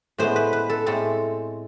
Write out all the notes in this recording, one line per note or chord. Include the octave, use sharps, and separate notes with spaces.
A2 G#3 B3 C5
B4
B4
A4
A2 G#3 C4 A4